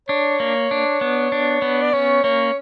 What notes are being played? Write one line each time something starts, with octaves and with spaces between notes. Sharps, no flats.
D4 C#5
A#3
D4
B3
D4
B3
D5
C#4 C#5
A#3 C#5